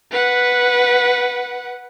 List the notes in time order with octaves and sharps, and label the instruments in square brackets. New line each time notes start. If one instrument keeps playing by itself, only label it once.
[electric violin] B4 F#5